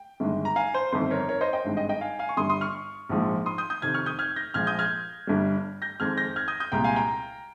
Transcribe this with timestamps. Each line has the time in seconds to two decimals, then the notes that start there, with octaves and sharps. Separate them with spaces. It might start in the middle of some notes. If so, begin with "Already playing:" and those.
Already playing: G5
0.20 G1 G2 D#3 G#3
0.45 A#5
0.56 F5 G#5
0.74 C5
0.92 G1 F2 D#3 C5
1.11 A#4 C#5
1.29 A#4 C#5
1.41 C5 D#5
1.53 D#5 G5
1.65 G#1 G2 D#3 G#3
1.77 D#5 G5
1.89 D#5 G5
2.01 F5 G#5
2.19 F5 G#5
2.29 C#6
2.37 G1 G2 G3 C6 D#6
2.49 C6 D#6
2.61 C#6 F6
3.09 A#1 G#2 F3 G#3
3.46 C6 D#6
3.58 D#6 G6
3.70 D#6 G6
3.82 F2 C3 D#3 F6 G#6
3.94 C#6 F6
4.06 D#6 G6
4.19 F6 G#6
4.36 G6 A#6
4.54 A#1 A#2 F3 G#3 F6 G#6
4.67 D#6 G6
4.79 F6 G#6
5.27 G1 G2 G3
5.82 G6 A#6
6.00 F2 D#3 G#3 F6 G#6
6.17 G6 A#6
6.36 F6 G#6
6.48 D#6 G6
6.60 D#6 G6
6.72 C2 A#2 G#3 G5 A#5
6.84 F5 G#5
6.96 G5 A#5